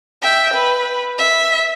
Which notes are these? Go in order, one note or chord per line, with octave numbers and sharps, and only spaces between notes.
E5 G5
B4
E5